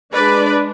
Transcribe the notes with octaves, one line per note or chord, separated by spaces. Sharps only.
G#3 D4 B4 D5